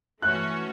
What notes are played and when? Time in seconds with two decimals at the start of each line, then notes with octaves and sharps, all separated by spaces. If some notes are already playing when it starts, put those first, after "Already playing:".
0.22 E3 A3 C#4 F#4 C#5 F#6